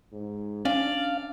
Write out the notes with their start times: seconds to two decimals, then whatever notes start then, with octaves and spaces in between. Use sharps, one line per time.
0.12 G#2
0.65 C#4 D4 D5 F5